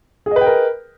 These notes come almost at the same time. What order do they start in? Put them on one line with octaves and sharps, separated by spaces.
G#4 D#5 B4 G5 A#4